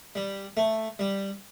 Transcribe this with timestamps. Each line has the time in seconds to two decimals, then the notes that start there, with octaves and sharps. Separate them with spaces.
0.15 G3
0.57 A3
0.99 G3